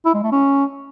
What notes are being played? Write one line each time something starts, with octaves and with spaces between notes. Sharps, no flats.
E4
G#3
A3
C#4